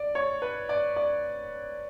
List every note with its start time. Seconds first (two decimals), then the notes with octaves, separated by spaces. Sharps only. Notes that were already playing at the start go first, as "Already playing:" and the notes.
Already playing: D5
0.15 C#5
0.42 B4
0.69 D5
0.96 D5